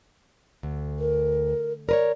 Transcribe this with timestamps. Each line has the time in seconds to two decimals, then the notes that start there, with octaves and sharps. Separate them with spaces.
0.63 D2
0.99 A#4
1.89 A#4 B4 C#5 D5